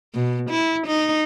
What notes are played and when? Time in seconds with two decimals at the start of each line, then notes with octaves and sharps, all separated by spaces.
0.14 B2
0.50 E4
0.87 D#4